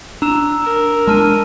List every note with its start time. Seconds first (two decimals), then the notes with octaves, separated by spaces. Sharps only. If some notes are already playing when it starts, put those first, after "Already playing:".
0.22 D4 A#5 E6 E7
0.61 A#4
1.07 G#3 C#4 D4 A5 F6 D#7